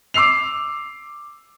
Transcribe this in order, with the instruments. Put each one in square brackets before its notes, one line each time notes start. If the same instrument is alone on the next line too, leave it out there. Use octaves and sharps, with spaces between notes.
[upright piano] D6 E6 C7 F7